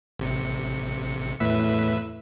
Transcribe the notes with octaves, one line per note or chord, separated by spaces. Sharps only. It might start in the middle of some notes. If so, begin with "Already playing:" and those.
A1 C3 C#7
E2 A2 B4 E5